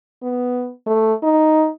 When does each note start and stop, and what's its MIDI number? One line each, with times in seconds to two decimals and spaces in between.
0.23 0.70 59
0.86 1.13 57
1.23 1.69 63